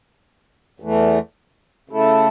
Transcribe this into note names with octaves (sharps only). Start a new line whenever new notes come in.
E2 E3 A3
C#3 A3 E4 A4